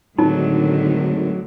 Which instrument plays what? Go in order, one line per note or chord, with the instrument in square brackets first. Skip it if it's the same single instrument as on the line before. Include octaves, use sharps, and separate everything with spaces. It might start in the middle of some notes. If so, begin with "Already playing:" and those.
[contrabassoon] G#1 [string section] A2 D3 D#3 [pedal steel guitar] F#3 [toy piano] D#4